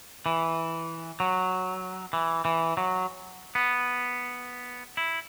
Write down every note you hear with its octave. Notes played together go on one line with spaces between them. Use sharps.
E3
F#3
E3
E3
F#3
B3
E4